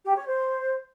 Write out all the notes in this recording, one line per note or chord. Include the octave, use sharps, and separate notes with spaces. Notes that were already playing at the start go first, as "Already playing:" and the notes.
G4
C#5
C5